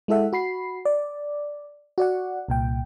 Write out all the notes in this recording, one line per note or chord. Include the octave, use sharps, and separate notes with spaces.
G#3 E4 A4 E5 F#5
F#4 B5 C7
D5
F#4 D5 F#5
C2 A#2 G5